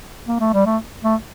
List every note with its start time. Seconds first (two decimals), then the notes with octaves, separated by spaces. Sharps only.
0.27 A#3
0.40 A3
0.53 G3
0.66 A3
1.04 A3